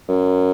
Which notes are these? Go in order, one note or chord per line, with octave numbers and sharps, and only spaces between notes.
F#2